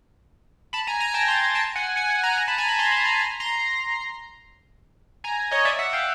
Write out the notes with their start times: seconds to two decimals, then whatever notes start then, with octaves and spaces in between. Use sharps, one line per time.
0.73 A5 B5
0.87 G#5 A#5
1.00 G#5 A#5
1.14 G5 A5
1.28 A#5 C6
1.55 G5 A5
1.75 F#5 G#5
1.96 F#5 G#5
2.10 F#5 G#5
2.23 G#5 A#5
2.37 G#5 A#5
2.48 A5 B5
2.58 G#5 A#5
2.68 A5 B5
2.79 A#5 C6
2.92 A5 B5
3.06 G#5 A#5
3.19 G#5 A#5
3.40 A#5 C6
5.24 G#5 A#5
5.51 C#5 D#5
5.65 D5 E5
5.79 E5 F#5
5.93 F5 G5